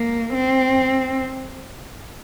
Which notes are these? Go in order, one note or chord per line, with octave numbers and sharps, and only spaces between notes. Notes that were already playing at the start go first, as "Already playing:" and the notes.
Already playing: A#3
C4